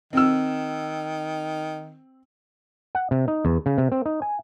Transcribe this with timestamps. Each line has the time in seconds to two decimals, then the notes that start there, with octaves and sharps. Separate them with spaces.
0.13 D#3 C4 E6
2.95 F#5
3.11 C3
3.28 D#4
3.45 E2
3.66 C#3
3.78 C3
3.92 C4
4.06 D#4
4.22 G#5